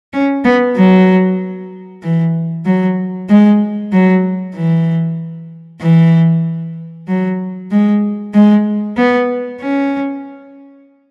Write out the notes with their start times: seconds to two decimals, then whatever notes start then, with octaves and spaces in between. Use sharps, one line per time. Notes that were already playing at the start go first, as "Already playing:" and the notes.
0.13 C#4
0.45 B3
0.77 F#3
2.03 E3
2.66 F#3
3.29 G#3
3.93 F#3
4.55 E3
5.81 E3
7.08 F#3
7.71 G#3
8.34 G#3
8.97 B3
9.60 C#4